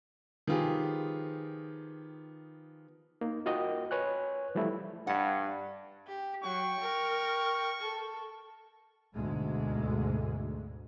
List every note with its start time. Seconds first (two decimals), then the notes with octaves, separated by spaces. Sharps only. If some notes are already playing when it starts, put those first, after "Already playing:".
0.47 D#3 F3 B3 F4 G4 G#4
3.21 A#3 D#4
3.46 F4 F#4 A#4 D#5 G5
3.91 B4 C#5 G#5 F#6
4.55 E3 F3 G3 A3 E4
5.07 G2 F#5
6.07 G4
6.44 F#3 G5 C#6
6.80 A#4
7.81 A4
9.15 D2 G#2 B2 G#3